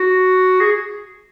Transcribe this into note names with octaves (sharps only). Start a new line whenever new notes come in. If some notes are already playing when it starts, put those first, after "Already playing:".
Already playing: F#4
G#4